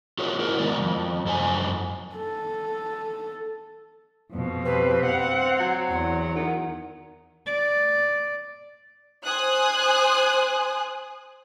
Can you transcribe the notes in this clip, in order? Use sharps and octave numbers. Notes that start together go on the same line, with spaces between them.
F4 F#4 G#4 A#4 C#5
E4 F#4 A#4 C5
D#3 G#3 B3 A#4 D5
F2
F#2 A4 C5 G#5
A4
F2 B2
G3 C4 B4
F5 F#5
F#3
E2 F#5
D#3
D5
C5 G#5 D#6 F#6